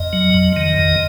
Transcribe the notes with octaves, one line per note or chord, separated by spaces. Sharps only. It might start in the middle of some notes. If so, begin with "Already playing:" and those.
Already playing: F2 D#5
F#3
F2
D#3
F2